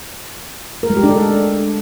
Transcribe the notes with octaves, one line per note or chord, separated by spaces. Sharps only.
A#4
G#3
G4
D4
A4